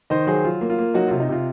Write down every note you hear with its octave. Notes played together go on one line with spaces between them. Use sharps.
D#3 C5 D#5
F#3 G#4 C5
F#3 F4
A#3
F4
A#3
F#3 D#4 F#4
C3 F4
D#4
C3 F4